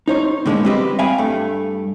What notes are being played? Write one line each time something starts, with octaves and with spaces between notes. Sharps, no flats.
D#4 C5 C#5
A2 D3 G#3 A#3 B3
G3 C4 G4 B4 D#5
E5 F5 G5 G#5 B5
G2 A3